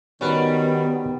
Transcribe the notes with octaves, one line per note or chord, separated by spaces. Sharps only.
D#3 G3 B3 C#4 F#4 B4